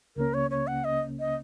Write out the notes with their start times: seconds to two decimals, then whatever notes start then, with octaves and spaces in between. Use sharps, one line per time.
0.16 C#2 C#3 A#3 C#4 A#4
0.34 C#5
0.51 C#5
0.67 F#5
0.84 D#5
1.19 D#5